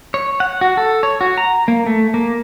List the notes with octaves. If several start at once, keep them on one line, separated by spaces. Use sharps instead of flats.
C#5
F#5
F#4
A4
C#5
F#4
A#5
A#3
A3
A#3